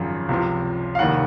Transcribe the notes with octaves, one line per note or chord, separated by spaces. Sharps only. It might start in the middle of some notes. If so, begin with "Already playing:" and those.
Already playing: G#1 F#2 C#3 F3
C#2 C3 F3
F5
F1 D#2 D#3 F#5